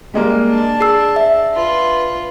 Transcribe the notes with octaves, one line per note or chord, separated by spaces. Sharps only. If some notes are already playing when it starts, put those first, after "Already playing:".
G3 G#3 A#3
D4 A5
G#4 E6 C7
E5
F4 B4